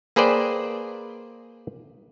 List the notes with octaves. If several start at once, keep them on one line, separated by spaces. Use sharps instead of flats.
A#3 G#4 B4 C5 D5 G5